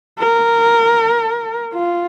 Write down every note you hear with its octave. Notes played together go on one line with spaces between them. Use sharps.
A#4
F4